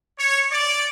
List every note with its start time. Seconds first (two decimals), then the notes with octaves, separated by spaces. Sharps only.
0.18 C#5
0.51 D5